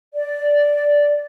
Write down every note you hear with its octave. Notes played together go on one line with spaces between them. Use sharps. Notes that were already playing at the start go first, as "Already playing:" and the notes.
D5